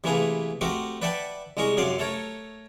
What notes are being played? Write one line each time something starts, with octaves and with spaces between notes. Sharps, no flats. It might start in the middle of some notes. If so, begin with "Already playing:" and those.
C3 E3 A3 A#3 G#4 B4
A3 C4 F#4 G4 A#4 D#5
B4 D5 E5 F#5 G5 A5
C2 G#3 A#4 D#5 C#6
F#2 C3 F5 F#5 C6 D6
A3 A4 A#4 C#5